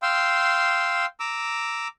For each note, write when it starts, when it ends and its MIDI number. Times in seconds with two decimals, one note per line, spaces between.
0.02 1.06 77
0.02 1.06 79
0.02 1.06 84
0.02 1.06 88
1.20 1.88 82
1.20 1.88 86
1.20 1.88 88